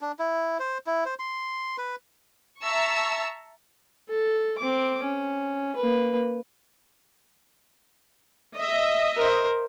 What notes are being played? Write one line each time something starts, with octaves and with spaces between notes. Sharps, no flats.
D4
E4
C5
E4
C5
C6
B4
E5 A5 A#5 C#6 E6
A4
C4 D6
C#4
A#3 B4
D#5 E5
A#4 C5